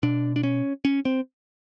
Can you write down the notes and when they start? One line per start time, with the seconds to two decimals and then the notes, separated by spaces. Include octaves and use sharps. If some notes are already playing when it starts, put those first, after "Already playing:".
0.03 B2 D4
0.36 D4
0.43 C#4
0.85 C#4
1.05 C4